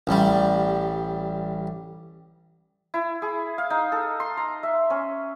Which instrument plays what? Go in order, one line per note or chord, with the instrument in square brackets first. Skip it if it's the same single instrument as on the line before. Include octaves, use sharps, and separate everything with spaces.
[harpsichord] A1 G3
[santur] E4
G#4
F5
D#4
A4
C6
A#5
E5
C#4